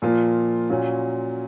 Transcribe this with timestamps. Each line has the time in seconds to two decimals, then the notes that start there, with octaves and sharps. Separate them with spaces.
0.02 A#2 F3 A#3 F4
0.70 A#2 F#3 C#4 F4